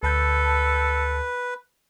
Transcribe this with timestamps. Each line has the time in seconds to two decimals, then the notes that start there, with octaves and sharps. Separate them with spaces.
0.03 D2 A4 B4 A5 G6